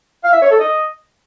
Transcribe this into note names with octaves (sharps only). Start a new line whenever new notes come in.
F5
E5
C#5
A4
D#5